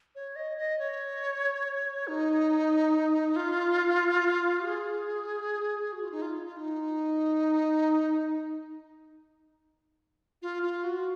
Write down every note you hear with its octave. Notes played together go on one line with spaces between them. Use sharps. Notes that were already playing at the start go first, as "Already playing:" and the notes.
C#5
D#5
D#5
C#5
D#4
F4
G#4
F#4
F4
D#4
F4
F4
D#4
F4
F4
F#4